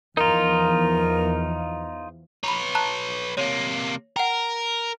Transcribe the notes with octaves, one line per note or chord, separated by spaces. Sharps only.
E2 F3 D#4 F4 A#4
B4 C#5 A#5 B5
A5 A#5 F#6
C3 A#3 C#5
A#4 F#5 G5